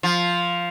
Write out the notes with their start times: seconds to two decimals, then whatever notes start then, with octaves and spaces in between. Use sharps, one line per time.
0.03 F3